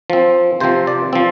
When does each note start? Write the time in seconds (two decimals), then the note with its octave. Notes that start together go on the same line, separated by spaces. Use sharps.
0.10 F3 C4
0.60 C3 F3 C4 C5
0.87 D5
1.13 F3 C4